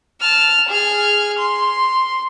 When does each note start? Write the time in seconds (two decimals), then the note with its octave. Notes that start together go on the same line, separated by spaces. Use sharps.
0.21 A5 F6
0.68 G#4 F6
1.38 C6